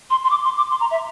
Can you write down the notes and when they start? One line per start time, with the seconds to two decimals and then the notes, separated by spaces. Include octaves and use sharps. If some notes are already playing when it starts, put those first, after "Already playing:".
0.10 C6
0.25 C6
0.30 D6
0.44 C6
0.57 D6
0.71 C6
0.80 A#5
0.91 E5